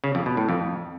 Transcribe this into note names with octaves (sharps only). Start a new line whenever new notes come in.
C#3
F2
B2
A2
F2